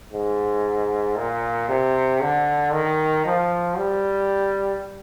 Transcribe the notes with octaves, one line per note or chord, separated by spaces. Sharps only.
G#2
A#2
C3
D3
D#3
F3
G3